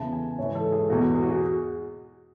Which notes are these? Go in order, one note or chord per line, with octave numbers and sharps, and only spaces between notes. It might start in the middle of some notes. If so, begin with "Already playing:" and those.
Already playing: E2 C#3 E3 A5
G#5
G#2 E3 C#5
A4
G#4
E2 B2 F#4
G#4
F#4
G#4